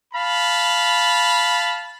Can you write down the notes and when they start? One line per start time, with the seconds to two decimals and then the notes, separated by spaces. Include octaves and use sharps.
0.14 F5 A5 B5